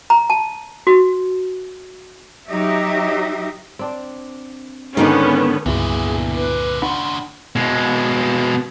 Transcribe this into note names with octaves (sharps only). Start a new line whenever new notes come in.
A#5
A5
F#4
F#3 D#4 G4 D#5 E5
C4 D4 D5
G#2 D3 D#3 A#3 B3 C#4
C#2 G2 A#2 D3 B3 E4 F#4 G#4
B4
D#2 C#3 D4 F#5 B5 C6
B2 G#3